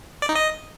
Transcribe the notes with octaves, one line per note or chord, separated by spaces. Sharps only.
D5
D#4
D#5